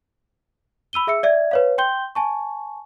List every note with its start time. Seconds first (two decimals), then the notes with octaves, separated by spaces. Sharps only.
0.93 B5 E6 D#7 G7
1.07 G#4 E5 E6 C#7
1.23 D5 E5 G#6
1.51 B4 C#5 F5
1.78 G5 C6 G6 G7
2.15 G#5 A5 C#6